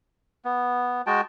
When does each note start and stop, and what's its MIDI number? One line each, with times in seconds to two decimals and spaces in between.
0.45 1.02 59
1.07 1.21 56
1.07 1.21 66
1.07 1.21 79
1.07 1.21 81